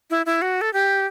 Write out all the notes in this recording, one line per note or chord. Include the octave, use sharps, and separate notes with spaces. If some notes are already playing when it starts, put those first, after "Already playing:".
E4
E4
F#4
A4
G4